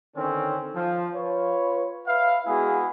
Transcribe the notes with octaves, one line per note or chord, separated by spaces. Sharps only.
D3 D#3 C4 C#4
F3
F4 B4 C#5
B4 E5 F5
G#3 B3 E4 F#4 G#4